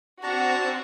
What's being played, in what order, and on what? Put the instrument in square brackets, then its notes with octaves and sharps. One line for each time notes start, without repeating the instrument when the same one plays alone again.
[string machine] C4 [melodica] D4 A5 A#5 [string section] F#4